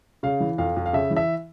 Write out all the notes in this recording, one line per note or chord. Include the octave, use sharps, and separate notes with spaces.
C#3 F5
E3
F2 F5
F2
F5
C#3 E5
E3
E5